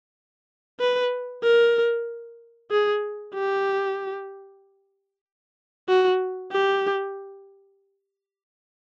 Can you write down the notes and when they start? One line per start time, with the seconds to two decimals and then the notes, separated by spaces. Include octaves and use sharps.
0.80 B4
1.44 A#4
2.71 G#4
3.35 G4
5.88 F#4
6.52 G4